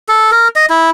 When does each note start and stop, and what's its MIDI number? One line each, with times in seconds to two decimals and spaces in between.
0.08 0.31 69
0.32 0.48 70
0.56 0.66 75
0.70 0.90 64